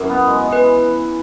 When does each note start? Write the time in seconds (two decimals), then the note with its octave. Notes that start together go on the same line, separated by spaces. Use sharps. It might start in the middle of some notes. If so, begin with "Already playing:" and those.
Already playing: F#2 E4 A#4
0.09 B3
0.27 G#3
0.45 E3
0.52 B4